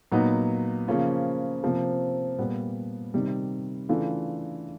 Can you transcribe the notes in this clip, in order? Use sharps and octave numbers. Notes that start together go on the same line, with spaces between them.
A#2 F#3 B3 D#4
C#3 F3 A#3 C#4 F4
C3 F3 A#3
A#2 G3 B3
C3 D#3 G3
C#3 E3 A3 D4 F4